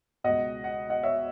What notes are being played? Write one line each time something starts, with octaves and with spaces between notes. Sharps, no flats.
C#2 B2 D#5 F#5
F#5
D#5 F#5
C#5 E5